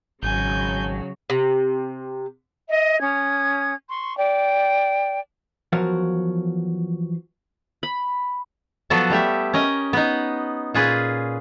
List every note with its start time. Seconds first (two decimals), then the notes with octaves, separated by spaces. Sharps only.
0.23 G#1 C#3 F#3 G#5 G6
1.30 C3
2.70 D#5 E5
3.00 C#4 D#6 G#6
3.89 C6 C#6
4.17 D5 G5
5.72 E2 F3 F#3 F#4 A#4 F5
7.83 B5
8.90 F3 F#3 B3 F#4 A4
9.10 G3 A3 G4 E5
9.53 C#4 A#4 D#5
9.93 B3 D#4
10.74 A#2 C#4 F4 G#4 B4